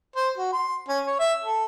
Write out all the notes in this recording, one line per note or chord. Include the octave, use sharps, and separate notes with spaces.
C5
F#4
C6
C#4
C#5
E5
A4